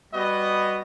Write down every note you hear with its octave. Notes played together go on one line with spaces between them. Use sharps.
G3 B3 F#4 D#5